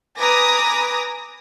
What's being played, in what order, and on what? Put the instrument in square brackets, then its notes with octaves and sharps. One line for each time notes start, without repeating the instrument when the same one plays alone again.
[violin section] B4 G#5 A#5 D6 D#6 A#6